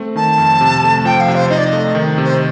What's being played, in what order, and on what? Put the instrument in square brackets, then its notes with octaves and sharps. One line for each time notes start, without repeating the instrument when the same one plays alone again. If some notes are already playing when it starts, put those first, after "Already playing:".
Already playing: [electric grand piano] A3 C4
[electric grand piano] D#3 [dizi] A5
[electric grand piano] F2
C3
A3
[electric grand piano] F3 [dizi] G5
[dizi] F5
[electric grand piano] C3
[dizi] C5
[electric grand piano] D#4 [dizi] D#5
[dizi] D5
D#5
[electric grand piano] A3
D#3
C3
[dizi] C5